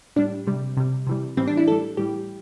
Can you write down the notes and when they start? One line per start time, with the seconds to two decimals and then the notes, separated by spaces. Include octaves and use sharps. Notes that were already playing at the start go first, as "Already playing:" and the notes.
0.16 A2 G3 D4
0.47 C3 G3
0.77 C3 G3
1.07 C3 E3 G3
1.37 A2 E3 G3 C4
1.47 D4
1.57 E4
1.67 A2 A4
1.72 G3
1.97 A2 E3 G3 G4